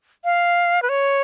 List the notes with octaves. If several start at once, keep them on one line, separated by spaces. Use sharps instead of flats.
F5
B4
C#5